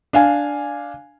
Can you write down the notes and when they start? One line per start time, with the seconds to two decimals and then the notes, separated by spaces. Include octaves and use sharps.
0.13 D4 F5 G#5